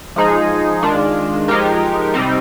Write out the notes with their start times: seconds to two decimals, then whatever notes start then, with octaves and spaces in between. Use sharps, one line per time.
0.16 F3 G#3 D#4 G#4
0.83 D#3 G#3 D4 F4
1.48 F3 G#3 D#4 G4 A#4
2.14 C3 G3 C4 D#4